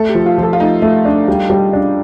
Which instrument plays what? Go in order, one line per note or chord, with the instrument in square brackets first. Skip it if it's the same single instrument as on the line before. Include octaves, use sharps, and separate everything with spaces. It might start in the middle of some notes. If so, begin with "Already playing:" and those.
Already playing: [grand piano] A3 [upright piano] A4
[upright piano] G4
[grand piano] F3
[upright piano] F4
[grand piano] F3
[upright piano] A4
F4
[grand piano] A3 [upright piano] D#4
[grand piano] A3
D4
G3
G3
D4